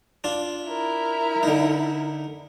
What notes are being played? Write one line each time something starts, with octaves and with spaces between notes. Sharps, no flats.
D4 F4
E4 A#4
D3 D#4